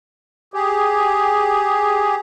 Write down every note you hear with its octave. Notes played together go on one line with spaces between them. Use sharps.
G4 G#4